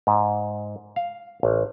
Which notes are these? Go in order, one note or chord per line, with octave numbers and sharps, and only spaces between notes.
G#2
F5
A1